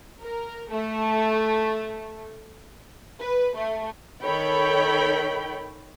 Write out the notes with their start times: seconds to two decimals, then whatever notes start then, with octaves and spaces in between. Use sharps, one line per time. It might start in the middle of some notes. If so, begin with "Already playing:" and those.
0.21 A#4
0.70 A3
3.20 B4
3.56 A3
4.24 D#3 A4 C#5 G5 B5